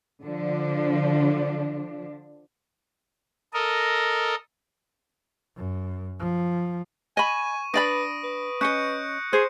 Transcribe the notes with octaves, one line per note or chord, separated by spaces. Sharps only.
D3 F3 D4
A4 A#4 D#5
F#2
F3
D#5 G#5 B5 C#6 D#7
D4 B4 D5 B5 D#6 A#6 D7
B4
C#4 D#5 F#6 G6 C#7
G#4 C5